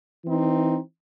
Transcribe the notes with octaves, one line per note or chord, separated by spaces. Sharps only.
E3 C4 D#4